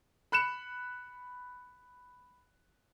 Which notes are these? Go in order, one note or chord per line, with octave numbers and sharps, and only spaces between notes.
B5 F#6 C#7 E7